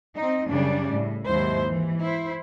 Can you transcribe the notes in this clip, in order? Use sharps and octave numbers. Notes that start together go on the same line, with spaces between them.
C4 D#4
F#2 C#3 G3 D4 D5
A2
D#2 G#2 F#3 E4 C5
E3
E4 C5